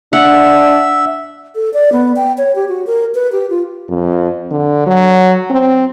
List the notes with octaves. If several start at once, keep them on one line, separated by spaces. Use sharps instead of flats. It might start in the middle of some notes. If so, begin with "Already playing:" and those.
D4 E5 F#5
A4
D5
B3
G5
C#5
G4
F#4
A#4
B4
G4
F4
F2
D3
F#3
C4